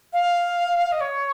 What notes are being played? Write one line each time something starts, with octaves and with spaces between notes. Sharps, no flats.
F5
D#5
C#5